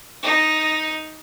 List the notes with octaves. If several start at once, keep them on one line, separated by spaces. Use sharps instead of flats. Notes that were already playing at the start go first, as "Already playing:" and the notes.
D#4